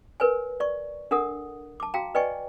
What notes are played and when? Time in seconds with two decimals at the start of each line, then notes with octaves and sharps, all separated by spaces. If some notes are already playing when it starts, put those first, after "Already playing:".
0.20 A#4 B4 C#5 G#5
0.60 D5 C#6
1.11 D4 A4 A#4 F#5 D#6
1.80 A5 D6
1.94 F#4 F5 G5 A#5
2.15 B4 D5 D#5 G5 G#5 C#6